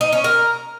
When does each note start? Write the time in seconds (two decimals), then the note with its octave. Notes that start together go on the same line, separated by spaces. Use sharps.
0.01 D#4
0.13 C#4
0.24 A#4